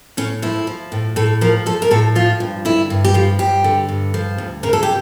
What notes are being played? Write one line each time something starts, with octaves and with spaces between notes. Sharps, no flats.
A2 C#4
F3 E4
F3
A2
A2 A4
F3 A#4
F3 A4
A#4
A2 A4
F3 F4
G2
D3 E4
G2
G4
F3 F4
G2 G4
D3
G2
F3
D2
C#3 A#4
A4
G4